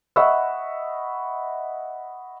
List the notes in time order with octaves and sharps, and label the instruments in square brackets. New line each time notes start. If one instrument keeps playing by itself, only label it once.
[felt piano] D#5 E5 F#5 B5 C#6 E6